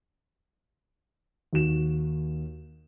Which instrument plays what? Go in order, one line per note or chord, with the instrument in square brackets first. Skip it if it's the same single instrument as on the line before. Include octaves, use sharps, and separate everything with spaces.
[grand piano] D#2 F#4 E7